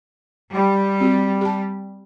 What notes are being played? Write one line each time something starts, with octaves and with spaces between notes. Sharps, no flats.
G3
C4 F#4 G4
G4 A5